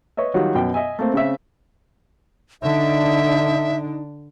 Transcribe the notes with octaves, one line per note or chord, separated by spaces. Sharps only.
B4 C#5 D#5 E5
D#3 F#3 G3 F4
F#2 B2 G5
D#5 E5 G#5
A3 A#3 C4
C#3 C4 E5
D3 D4 D#4 E5